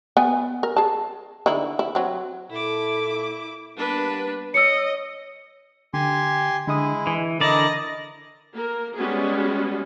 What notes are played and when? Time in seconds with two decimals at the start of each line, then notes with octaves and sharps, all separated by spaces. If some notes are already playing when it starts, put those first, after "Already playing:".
0.17 B3 G#5
0.63 A#4
0.76 G#4 A5
1.46 D3 D#4 E4
1.79 E4
1.95 F#3 C4
2.50 A#2 E4 A4 D6
3.77 G3 A#3 B3 D4 B4
4.54 C#5 D#5 E6 C#7
5.94 D3 G4 G#5 C6
6.68 D3 G#3 E4 D#6
7.07 E3 G#5
7.41 D3 E4 A#4 D5 D#5
8.53 A#3 A#4
8.95 G3 G#3 B3 C#4 F#4 G#4